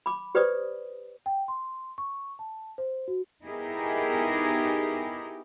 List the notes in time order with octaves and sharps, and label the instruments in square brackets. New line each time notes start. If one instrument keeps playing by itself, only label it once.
[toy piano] B5 D6
G4 B4 C5 D5 D#6
[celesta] G5
C6
C#6
A5
C5
F#4
[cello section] B3 D#4 E4 G4 G#4 A#4